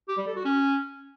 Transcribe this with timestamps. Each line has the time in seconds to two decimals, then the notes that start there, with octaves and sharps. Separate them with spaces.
0.09 G4
0.18 G3
0.27 A4
0.36 F#4
0.45 C#4